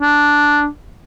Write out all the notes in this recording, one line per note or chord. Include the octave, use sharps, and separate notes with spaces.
D4